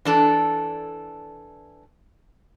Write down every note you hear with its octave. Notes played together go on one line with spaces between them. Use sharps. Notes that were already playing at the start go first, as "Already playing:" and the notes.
E3 D4 A4